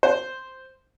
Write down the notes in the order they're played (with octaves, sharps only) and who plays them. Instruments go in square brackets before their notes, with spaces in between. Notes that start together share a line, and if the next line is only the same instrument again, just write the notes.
[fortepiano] C5